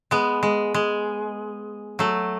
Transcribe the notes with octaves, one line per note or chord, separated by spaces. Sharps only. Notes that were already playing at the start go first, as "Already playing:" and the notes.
G#3 B3
G#3
G#3
F#3 A3